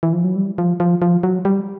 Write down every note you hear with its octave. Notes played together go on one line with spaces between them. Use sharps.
E3
F3
F#3
G3
F3
F3
F3
F#3
G3